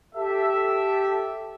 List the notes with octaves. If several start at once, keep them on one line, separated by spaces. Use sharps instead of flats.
G4 A4 E5